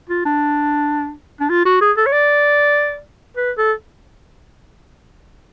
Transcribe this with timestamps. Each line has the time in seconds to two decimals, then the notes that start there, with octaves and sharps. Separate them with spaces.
0.09 F4
0.25 D4
1.40 D4
1.49 F4
1.65 F#4
1.81 G#4
1.97 A4
2.06 C#5
2.12 D5
3.37 B4
3.58 A4